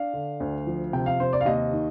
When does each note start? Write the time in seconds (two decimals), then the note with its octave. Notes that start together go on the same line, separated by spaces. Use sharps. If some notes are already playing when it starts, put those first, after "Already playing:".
Already playing: D4 F5
0.13 D3
0.40 D2
0.67 F3
0.93 C3 G5
1.06 F5
1.20 C3 C5
1.33 D5
1.41 F5
1.45 D#2 D#5
1.73 D#3